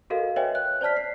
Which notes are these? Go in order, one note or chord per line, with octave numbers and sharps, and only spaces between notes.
F#4 A4 A#4 D#5 F5
B4 C#5 D#5 E5 G5 G#5
F#6
C5 D5 A5 F6 B6
C7